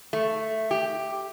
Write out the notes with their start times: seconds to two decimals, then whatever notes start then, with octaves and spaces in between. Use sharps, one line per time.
0.13 A3
0.71 G4